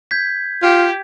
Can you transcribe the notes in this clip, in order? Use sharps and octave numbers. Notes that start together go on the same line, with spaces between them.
G6 G#6 B6
F4 G4